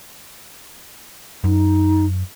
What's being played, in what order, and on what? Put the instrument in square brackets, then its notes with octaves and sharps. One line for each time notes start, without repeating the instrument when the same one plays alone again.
[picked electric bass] F#2 [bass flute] D#4